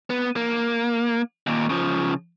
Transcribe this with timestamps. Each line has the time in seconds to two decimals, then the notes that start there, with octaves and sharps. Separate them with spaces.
0.10 B3
0.36 A#3
1.47 D#2 A#2
1.69 C#3 F3